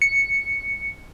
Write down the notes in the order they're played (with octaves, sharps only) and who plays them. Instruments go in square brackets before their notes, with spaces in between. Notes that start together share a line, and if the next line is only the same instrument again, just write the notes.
[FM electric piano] C#7